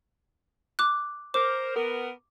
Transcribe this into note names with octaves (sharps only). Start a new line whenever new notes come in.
D6 F#6
A#4 C5 D6
B3 A#4